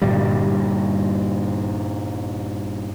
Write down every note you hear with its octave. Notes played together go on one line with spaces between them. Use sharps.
G2 A#2 D3 G3